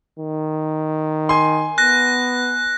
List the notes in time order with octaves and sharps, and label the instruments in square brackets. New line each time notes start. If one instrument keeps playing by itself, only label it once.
[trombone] D#3
[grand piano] G#5 C6
[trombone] B3 [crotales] F#6 A#6